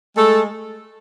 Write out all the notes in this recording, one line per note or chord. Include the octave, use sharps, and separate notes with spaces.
G#3 A3 A4